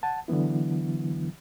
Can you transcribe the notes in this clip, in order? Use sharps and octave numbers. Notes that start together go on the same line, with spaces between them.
F#5 A5
D3 E3 F#3 B3 E4